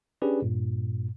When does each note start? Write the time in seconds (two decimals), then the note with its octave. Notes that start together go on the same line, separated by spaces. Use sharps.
0.22 C#4 D4 G4 G#4 B4 D5
0.42 G2 A#2